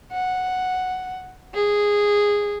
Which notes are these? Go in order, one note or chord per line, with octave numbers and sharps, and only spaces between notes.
F#5
G#4